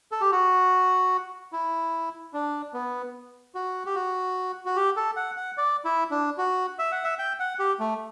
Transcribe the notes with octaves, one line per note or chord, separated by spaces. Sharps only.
A4
G4
F#4
E4
D4
B3
F#4
G4
F#4
F#4
G4
A4
F#5
F#5
D5
E4
D4
F#4
E5
F#5
E5
G5
F#5
G4
A3